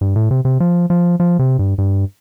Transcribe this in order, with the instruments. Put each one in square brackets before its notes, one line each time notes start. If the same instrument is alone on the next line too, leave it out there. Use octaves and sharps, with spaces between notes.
[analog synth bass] G2
A2
C3
C3
F3
F3
F3
C3
G2
G2